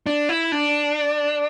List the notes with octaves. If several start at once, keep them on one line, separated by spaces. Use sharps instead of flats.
D4
E4
D4